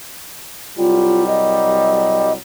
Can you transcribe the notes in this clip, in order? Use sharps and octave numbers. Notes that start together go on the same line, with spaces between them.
C2 F#3 G3 F4
D#5